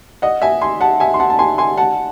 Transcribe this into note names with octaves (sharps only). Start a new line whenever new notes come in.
D#5 F#5
E5 G#5
G#5 C6
F#5 A5
E5 G#5
C6
F#5 A5
A5
G#5 C6
G#5 C6
F#5 A5